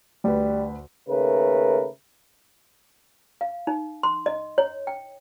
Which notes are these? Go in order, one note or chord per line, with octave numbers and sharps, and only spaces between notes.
D2 G3 B4
D#2 C#3 A3 A#4 B4
F5
D#4
C6
D#5
C#5
G5